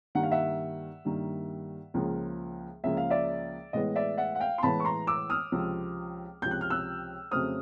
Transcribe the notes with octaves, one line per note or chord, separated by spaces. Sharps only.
G2 D#3 G3 A#3 F#5
F5
E5 F#5
G2 D#3 G3 A#3
C#2 C#3 F3 A#3
C#2 C#3 F3 A#3 E5
F5
D5 E5
A2 E3 G#3 B3 D#5
D5 E5
E5 F#5
F#5
F5 G5
C6
A2 E3 G#3 B3 A5 B5
C#6
A#5 C6
D6 E6
D#6 F6
C#2 C3 F3
C#2 C3 F3 G6
F#6
F6
E6 F#6
F2 C#3 F#3 A3 C4 D#6 F6